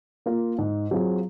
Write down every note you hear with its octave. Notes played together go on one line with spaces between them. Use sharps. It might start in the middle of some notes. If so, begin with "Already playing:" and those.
A#3 F4 A#4
G#2
F#3 C4 F4 G#4